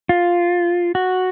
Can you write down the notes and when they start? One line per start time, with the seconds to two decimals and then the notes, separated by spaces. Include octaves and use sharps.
0.09 F4
0.95 F#4